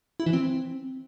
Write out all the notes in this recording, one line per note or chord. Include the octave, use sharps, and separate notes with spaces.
E4
E3
C4